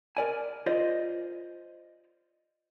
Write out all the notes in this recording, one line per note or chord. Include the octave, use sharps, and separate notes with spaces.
A#4 D5 G#5
F4 C5 D5 D#5